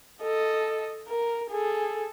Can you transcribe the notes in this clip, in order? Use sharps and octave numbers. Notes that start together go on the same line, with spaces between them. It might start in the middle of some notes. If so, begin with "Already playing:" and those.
A4 D#5
A#4
G#4 A4